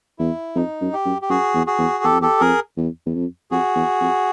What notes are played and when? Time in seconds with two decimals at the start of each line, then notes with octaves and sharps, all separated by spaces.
0.19 E2 E4
0.55 F2 D#4
0.81 F#2
0.93 G4
1.05 F#2
1.22 G4
1.29 F#2 F#4 G#4
1.54 E2
1.67 F#4 G#4
1.79 E2
2.04 E2 G4 A4
2.11 F2
2.20 E2 G4 A4
2.41 F2 G#4 A#4
2.77 E2
3.06 E2
3.14 F2
3.51 F2 F#4 G#4
3.76 E2
4.01 F2